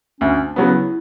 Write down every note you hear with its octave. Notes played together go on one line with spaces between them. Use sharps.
D2 C#4
D4
C#3 F#3 B3
E4